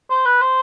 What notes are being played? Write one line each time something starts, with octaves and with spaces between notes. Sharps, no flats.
C5
B4
C5